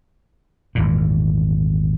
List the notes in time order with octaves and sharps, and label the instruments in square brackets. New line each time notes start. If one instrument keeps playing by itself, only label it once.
[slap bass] G#1 E2 A#2